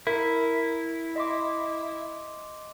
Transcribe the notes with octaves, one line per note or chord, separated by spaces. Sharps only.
E4 A#4
D#5 C6 D6